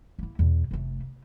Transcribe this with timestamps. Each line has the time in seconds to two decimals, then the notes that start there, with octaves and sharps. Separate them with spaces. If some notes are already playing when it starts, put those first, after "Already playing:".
0.19 A#3 E4
0.39 E2 B2
0.71 F1 A3
0.99 C#3